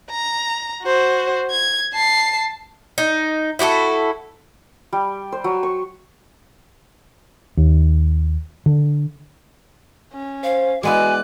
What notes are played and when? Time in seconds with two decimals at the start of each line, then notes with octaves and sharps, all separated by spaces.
0.10 A#5
0.84 F#4 C5
1.51 G#6
1.93 A5 C7
2.98 D#4
3.59 E4 F#4 G4 A4
4.93 G3
5.32 C5
5.44 F#3
5.63 C#6
7.57 D#2
8.66 D3
10.13 C#4
10.43 C5 F5
10.83 G#3 B3 E4 F#4 D5 G#5 F#6